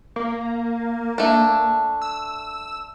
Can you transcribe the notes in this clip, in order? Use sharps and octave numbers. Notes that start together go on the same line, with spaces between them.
A#3
A3 D4
E6